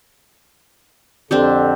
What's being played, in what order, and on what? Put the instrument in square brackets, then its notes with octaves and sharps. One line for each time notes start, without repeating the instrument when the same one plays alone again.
[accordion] F2 D3 [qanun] C4 D4 G4